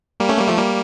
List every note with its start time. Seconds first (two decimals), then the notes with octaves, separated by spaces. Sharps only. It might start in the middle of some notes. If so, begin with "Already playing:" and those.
0.20 G3 A#3
0.29 A3 C#4
0.38 G3 A#3
0.48 F3 A3
0.58 G3 A#3